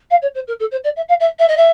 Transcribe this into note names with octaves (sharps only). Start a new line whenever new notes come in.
F5
C#5
C5
A#4
A4
C5
D5
E5
F5
E5
E5
D#5
E5